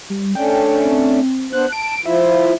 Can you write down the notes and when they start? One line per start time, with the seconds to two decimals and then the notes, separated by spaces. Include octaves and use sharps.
0.10 G3
0.35 A3 C#4 D4 G5
0.83 C4
1.53 B3 D4 C5 F#6
1.72 A5 D7
2.06 F3 E4 F4 E5